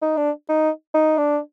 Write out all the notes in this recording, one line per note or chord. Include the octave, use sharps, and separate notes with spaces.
D#4
D4
D#4
D#4
D4